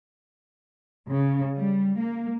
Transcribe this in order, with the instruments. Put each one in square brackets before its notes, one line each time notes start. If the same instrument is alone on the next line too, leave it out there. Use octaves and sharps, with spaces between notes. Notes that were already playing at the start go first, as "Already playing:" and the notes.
[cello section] C#3
G3
A#3